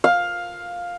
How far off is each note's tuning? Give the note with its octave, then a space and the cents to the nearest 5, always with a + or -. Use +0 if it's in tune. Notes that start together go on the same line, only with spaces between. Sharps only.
F5 +10